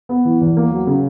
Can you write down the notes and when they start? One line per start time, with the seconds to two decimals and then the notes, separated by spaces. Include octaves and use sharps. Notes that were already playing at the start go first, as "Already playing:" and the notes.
0.09 B3
0.25 E3
0.41 E2
0.57 A#3
0.71 F#3
0.87 C#3